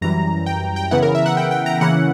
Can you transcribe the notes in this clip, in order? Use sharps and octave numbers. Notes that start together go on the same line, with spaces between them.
F#2 E3 G3 A#5
G5
G5
C#3 E3 B3 E4 F#5
A#4
E5
F#5
G5
G5
A#5
C#3 E3 A#3 C#4 E4 F#5